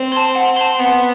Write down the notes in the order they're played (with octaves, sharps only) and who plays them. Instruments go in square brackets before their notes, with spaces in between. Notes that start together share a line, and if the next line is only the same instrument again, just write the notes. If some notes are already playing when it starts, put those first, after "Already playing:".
Already playing: [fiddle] C4
[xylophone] A5 C6
F#5
A5 C6
[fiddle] B3 [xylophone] F#5